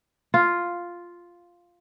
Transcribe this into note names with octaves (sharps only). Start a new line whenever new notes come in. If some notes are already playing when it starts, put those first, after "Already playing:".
F4